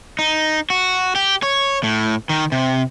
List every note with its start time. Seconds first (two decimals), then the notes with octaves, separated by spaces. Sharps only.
0.19 D#4
0.70 F#4
1.15 G4
1.43 C#5
1.83 A2
2.29 D#3
2.52 C3